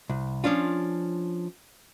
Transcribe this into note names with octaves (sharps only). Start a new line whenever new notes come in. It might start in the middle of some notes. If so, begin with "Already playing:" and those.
C2
F3 C#4 D4 F4